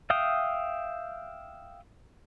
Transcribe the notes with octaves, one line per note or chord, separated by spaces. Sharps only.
E5 F5 G5 D#6